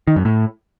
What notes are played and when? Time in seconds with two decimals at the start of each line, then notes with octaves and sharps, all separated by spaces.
0.08 D#3
0.16 F#2
0.25 A2